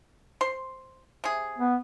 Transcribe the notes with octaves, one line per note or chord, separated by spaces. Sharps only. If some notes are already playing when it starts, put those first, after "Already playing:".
C5 C6
C3 G#4
B3